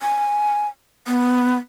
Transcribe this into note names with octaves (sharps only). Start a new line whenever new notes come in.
G#5
B3